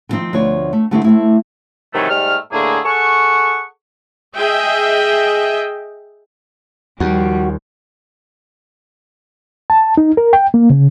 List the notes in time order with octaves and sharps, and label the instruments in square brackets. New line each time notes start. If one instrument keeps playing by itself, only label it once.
[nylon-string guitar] D3 D#3 F3 G3 C4 D#4
D2 B2 F3 C#5 D5
A3
D3 G3 A3 B3 C4 E4
A3 C4 E4
[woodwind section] C3 D#3 E3 F#3 G#3 A3
G#2 G3 A3 F6
A2 D3 A3 A#3 G#4
G#4 A4 F#5 C#6
[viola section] G#4 D#5 E5 G5
[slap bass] D#2 [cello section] F3 G3 [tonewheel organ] F#4
[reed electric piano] A5
D#4
A#4
G5
A#3
C#3